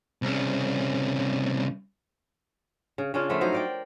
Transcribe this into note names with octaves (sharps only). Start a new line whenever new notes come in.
C2 C#3
C#3
C#3 C#4 D4 F4
F3 A3 B3 F4
F#3 D#4 C5
A#4 D5 G5